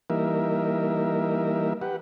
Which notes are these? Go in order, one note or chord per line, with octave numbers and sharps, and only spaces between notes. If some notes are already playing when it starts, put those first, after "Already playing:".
E3 G3 A#3 D#4 A#4 E5
G4 B4 F#5